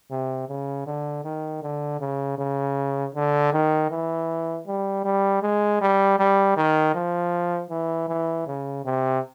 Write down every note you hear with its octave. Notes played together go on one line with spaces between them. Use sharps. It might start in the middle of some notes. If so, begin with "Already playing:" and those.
C3
C#3
D3
D#3
D3
C#3
C#3
D3
D#3
E3
G3
G3
G#3
G3
G3
D#3
F3
E3
E3
C#3
C3